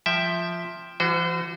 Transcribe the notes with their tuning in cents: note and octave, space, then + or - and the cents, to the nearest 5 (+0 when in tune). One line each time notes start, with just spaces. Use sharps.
F3 +0 E5 +0 G5 +0
E3 +45 F#4 +0 C5 -30